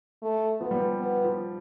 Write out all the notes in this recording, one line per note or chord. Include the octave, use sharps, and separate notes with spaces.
A3
F3 B3
G3
F3
B3
F3